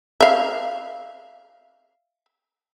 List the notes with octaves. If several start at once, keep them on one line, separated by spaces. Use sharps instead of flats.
E5 F5